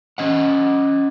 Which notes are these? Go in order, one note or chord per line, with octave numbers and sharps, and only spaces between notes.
C#4 D#5 F#5